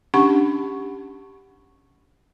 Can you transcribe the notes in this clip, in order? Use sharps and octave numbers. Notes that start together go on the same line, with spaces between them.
C#4 D4 G4 F#5 C#6